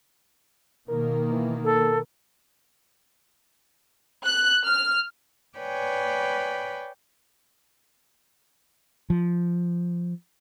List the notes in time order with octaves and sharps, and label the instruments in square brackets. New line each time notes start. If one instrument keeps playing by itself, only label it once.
[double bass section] B2 D#3 A#3 [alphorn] A#4
[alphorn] E3
[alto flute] A4 [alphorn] A#4
[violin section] F#6
F6
[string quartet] B4 C#5 D5 G5 G#5 B5
[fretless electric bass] F3